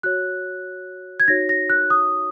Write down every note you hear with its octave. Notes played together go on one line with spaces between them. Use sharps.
F#4 C#5 F#6
G#6
D#4 F#4 C#5 A#6
A#6
F#6
D#6